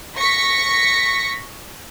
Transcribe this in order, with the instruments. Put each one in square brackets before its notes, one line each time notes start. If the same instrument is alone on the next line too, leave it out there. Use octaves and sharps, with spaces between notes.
[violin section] C#6 A#6 B6 C#7